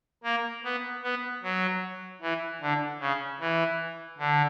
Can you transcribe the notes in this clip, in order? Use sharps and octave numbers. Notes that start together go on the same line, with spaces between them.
A#3
B3
B3
F#3
E3
D3
C#3
E3
D3